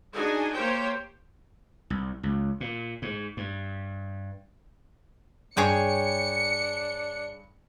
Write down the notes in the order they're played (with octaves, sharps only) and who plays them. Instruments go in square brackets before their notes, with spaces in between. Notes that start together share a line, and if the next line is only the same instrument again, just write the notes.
[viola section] D4 D#4 F#4 G#4 G#5
A#3 G4 C5 C#5 G5
[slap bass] C2
C#2
A#2
G#2
G2
[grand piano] G2 [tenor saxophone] D4 [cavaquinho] G#4 C#5 G5 [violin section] C#7